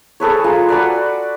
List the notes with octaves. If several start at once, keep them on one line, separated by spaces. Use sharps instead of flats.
G#4 A4 B4 C#5
G#3 F4 A#5
F#4 A4 B4 D5